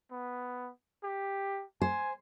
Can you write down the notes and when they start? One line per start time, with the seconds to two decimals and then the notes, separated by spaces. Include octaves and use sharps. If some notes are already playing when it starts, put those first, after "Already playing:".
0.11 B3
1.03 G4
1.82 C5 G#5